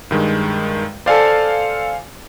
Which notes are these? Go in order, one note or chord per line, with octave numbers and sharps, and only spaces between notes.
G2 D#3 G#3
A4 C5 D5 F5 G#5